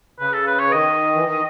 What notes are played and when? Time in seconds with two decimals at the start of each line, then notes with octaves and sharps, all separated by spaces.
0.20 C#3 B4
0.34 A4
0.47 B4
0.59 C#5
0.67 E3
0.72 D#3 D#5
1.15 E3
1.24 D#3